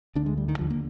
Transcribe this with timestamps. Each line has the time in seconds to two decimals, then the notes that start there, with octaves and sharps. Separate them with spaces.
0.15 D2 D3 D4
0.26 G#3
0.37 G3
0.48 D#3
0.58 D#2 D3 F3
0.70 A#3